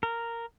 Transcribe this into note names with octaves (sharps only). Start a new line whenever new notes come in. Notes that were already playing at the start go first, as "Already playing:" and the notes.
A#4